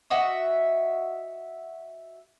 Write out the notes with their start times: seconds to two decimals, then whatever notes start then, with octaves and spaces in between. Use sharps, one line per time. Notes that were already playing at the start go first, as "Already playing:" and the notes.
0.10 F#4 D#5 E5